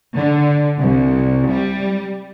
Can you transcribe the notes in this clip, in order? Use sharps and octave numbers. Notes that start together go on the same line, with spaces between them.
D3
C2
G3